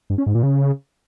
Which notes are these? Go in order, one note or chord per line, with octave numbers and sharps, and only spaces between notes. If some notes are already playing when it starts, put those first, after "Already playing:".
G2
C#4
G#2
A#2
C#3